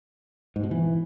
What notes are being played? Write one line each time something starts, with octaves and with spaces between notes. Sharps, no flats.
G#2
B2
E3